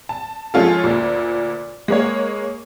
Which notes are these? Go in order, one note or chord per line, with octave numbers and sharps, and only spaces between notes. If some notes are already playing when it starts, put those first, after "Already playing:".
A5
F3 G#3 C#4 F4 A4
D2 A#2
G#3 A#3 C#5